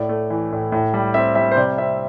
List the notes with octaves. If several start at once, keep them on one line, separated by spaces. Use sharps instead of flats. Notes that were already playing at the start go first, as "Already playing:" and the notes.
Already playing: A2 D5
A3
E3
A2
A2
G3
C4 E5
G3 E5
C5
C3 D5
C4 E5